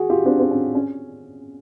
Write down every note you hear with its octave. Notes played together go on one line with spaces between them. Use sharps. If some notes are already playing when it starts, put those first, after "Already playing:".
Already playing: F#4 G#4
F4 G4
C4 D4
C4
C#4
C#4